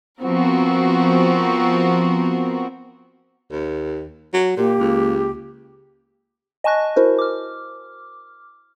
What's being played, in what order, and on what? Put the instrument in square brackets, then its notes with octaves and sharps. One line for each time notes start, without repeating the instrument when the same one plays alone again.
[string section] F3 B3 C4 F#4 A#4
[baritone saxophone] D#2
F#3
[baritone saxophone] A#2 [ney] A#3 [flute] G4
[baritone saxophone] C#2
[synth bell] D#5 G#5 A5 C#6 F#6 A#6
E4 F#4 A#4 C5
D6 F6